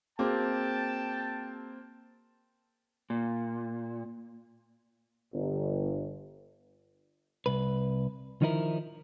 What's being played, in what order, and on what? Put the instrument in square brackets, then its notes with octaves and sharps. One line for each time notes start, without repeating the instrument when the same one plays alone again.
[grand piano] A#3 C4 [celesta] F#4 G#4 D6 [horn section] G5 A5
[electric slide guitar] A#2
[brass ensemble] G1
[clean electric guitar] C2 B4
D#3 F3 D#4 E4 A#4